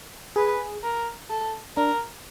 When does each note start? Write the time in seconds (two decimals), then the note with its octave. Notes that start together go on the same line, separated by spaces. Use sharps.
0.36 G#4 B4
0.84 A#4
1.30 A4
1.77 D4 A#4